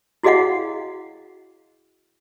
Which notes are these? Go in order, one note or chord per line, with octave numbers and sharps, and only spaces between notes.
E4 F#4 G#4 D#5 F5 F#5